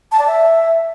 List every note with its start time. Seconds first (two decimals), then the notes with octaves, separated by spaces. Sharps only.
0.12 A5
0.19 D5
0.27 E5